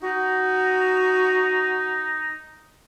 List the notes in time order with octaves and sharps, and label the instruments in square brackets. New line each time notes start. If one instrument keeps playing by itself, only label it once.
[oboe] D#4 [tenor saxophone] F#4